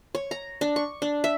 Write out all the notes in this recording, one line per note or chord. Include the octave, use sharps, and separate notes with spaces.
C#5
A#5
D4
C#6
D4
E5